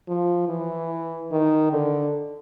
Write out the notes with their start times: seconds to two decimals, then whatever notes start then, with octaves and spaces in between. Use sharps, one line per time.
0.08 F3
0.49 E3
1.31 D#3
1.72 D3